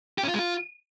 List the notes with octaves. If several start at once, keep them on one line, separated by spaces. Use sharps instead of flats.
G4
C#4
F4
G#3
F4